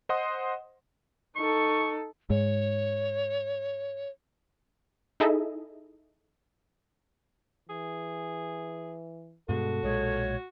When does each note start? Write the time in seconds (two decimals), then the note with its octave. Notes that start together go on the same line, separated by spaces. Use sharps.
0.09 C5 D#5 F#5 C6 D#6
1.37 D#4 A4 C#6
2.30 G#2 C#5
5.20 D#4 E4 G#4 A4 D#5 E5
7.69 E3 G#4
9.49 G2 B2 G#3 F#4 A4
9.83 B1 A#2 G#3 C#5